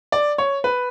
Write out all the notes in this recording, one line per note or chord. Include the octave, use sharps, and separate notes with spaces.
D5
C#5
B4